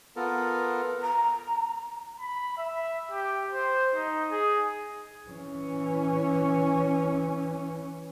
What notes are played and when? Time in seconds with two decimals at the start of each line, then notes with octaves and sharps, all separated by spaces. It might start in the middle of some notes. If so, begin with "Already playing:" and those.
0.16 B3 F4 A4 A#4
1.01 A#5
2.20 B5
2.58 E5
3.11 G4
3.50 C5
3.95 D#4
4.31 G#4
5.29 E3 C#4